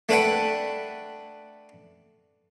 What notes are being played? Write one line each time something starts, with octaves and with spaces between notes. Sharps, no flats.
A3 D4 B4 F#5 G5